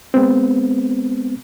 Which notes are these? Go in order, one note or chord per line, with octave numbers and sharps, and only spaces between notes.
G#3 B3 C4